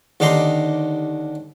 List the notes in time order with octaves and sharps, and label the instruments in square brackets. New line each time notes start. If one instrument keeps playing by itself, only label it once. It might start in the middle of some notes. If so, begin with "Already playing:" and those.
[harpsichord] D#2 D3 D#4 G4 A#5 C6